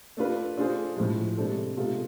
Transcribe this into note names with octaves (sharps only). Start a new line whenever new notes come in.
A3 D4 F4 B4
A3 D4 F4 G#4 C5
A2 F3 G#3
C3 G#3 D4 A4 C5
C3 G#3 B3 F4 A4